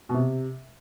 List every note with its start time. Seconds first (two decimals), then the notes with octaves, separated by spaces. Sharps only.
0.09 B2
0.14 C3